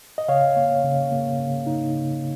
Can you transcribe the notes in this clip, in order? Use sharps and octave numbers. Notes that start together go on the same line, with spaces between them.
D#5
C#3 C#5 F5
A#3
C#3
A#3
C#3
D#4
C#3